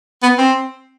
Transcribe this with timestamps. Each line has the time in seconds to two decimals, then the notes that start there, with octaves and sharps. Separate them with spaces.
0.23 B3
0.38 C4